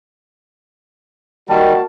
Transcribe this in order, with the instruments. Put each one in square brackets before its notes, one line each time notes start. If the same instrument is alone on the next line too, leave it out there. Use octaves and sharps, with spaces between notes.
[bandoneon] D#3 G3 [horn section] A#3 F#4 A5